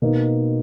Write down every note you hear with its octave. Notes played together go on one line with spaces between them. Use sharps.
B2 A#3 D#4